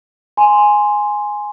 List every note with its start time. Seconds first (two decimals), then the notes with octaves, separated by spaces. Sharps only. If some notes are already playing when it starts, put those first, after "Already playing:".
0.37 G#5 C6